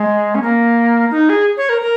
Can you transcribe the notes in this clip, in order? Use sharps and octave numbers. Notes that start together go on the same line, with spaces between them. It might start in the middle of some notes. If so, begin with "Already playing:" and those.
Already playing: G#3
C#4
A#3
D#4
G#4
C#5
A#4
A#4